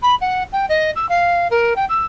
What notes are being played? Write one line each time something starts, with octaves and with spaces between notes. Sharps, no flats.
B5
F#5
G5
D#5
E6
F5
A#4
G5
E6